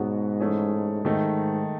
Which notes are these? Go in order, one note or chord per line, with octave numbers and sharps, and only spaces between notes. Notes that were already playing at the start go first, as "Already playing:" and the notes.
Already playing: G#2 B2 F#3 B3 F#4
E3 A3 C#4 G#4
G#2 D#3 A3 D#4